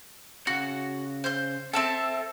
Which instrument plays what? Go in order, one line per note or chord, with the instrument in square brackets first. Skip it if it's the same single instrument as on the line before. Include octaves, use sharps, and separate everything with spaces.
[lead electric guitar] C#3 F#5 [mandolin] F#4
[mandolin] C5 G6
[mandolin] C4 E5 A5 [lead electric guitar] A4